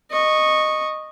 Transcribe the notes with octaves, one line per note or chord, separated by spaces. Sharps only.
D#5 C#6